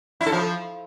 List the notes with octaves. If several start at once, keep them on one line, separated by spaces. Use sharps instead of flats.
E4
A4
F3